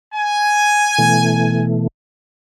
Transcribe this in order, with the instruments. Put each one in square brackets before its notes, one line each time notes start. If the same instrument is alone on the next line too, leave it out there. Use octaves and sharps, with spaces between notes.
[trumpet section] G#5
[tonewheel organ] B2 E3 A3